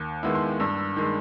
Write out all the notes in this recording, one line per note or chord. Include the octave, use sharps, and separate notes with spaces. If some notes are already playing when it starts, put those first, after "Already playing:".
Already playing: D#2
D#3 G#3 B3 E4
C6
G2 E6
D#3 G#3